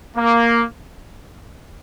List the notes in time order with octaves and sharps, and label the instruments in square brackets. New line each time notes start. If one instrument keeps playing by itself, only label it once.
[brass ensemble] A#3